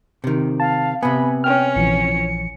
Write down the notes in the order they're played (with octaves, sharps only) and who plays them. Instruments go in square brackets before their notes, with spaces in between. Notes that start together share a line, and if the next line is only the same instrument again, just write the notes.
[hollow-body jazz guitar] C3 D#3
[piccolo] F5 [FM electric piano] A5
[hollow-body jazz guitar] C3 B3 [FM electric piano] G#5 [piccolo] B5
[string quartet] C#4 [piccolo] G5 [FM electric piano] F6
[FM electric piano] A#1 E3 F3 [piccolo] C#7